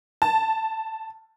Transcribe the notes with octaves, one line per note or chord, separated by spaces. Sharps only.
A5